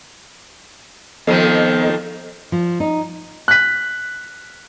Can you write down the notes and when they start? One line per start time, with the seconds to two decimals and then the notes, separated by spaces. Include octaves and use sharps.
1.27 F2 D#3 F3 B3 A4 D#5
2.52 F3
2.80 D#4
3.48 F#6 B6